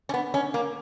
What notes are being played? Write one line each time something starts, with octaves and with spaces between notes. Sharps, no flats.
C#4
B3
C#4
A#3